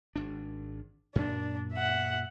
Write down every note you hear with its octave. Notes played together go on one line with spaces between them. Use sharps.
G#1 D4
F#2 A#2 D4
E5 F#5